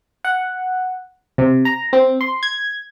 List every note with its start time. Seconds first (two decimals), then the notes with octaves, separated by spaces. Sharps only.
0.24 F#5
1.38 C3
1.65 A#5
1.93 C4
2.21 C6
2.43 G#6